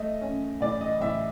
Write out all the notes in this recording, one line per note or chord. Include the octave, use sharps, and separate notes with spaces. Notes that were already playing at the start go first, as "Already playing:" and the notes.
Already playing: A3 D#5
C#4
A2 D5
D#5
A2 E5